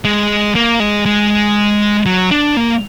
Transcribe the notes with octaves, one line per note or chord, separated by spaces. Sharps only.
G#3
A#3
G#3
G#3
F#3
D4
A#3